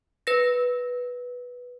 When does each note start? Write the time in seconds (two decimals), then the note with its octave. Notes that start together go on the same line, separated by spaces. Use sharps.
0.27 B4 A#6